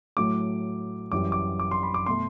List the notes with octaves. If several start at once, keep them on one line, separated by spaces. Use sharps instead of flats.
A2 F#3 A3 D6
F#2 E3 G3 D6
D6
D6
C6
B5
D6
B2 A3 C6